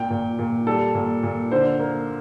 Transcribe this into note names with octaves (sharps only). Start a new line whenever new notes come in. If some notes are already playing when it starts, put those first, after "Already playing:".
Already playing: A#2 G5
A#2
A#2
G3 A4
A#2
A#2
D3 C5
A#3